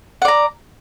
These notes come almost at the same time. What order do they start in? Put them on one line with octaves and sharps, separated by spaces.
F#5 D5 A#5